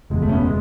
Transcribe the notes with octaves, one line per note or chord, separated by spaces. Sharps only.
F#1 E2 B2 G#3
A3
C#4
B3
G#3